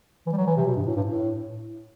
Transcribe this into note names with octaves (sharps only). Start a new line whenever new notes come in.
E3
G3
F#3
E3
C3
B2
G2
A2
G2
A2